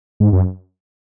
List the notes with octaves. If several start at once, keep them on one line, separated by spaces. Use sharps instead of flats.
G#2
F#2